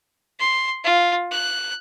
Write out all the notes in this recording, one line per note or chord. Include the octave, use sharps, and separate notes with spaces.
C6
F4
F#6